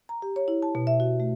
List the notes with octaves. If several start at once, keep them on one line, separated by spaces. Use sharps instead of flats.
A#5
G4
C#5
E4
A5
B2
E5
F#4
A3